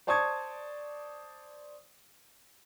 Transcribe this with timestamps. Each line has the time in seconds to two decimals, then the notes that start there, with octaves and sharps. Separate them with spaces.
0.07 C5 D5 A5 C#6 D#6 G#6